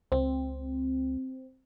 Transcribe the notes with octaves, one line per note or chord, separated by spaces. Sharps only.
C#2 C4